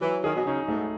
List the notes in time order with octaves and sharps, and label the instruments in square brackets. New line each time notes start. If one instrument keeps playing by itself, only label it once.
[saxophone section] E3 [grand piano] F#3
[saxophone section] D#3 [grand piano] G#4
[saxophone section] B2
[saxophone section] C#3 [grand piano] D#4
[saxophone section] G#2 [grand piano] A3